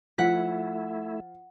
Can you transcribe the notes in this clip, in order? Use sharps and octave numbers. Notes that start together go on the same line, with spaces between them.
F3 A3 E4 F#5 B6